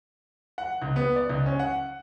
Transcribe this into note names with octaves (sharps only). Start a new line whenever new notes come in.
F#5
C#2
B3
D5
C#2
C#4
F#5